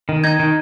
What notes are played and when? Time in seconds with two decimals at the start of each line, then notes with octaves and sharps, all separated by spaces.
0.09 D#3
0.24 D#4 G#6
0.39 D#3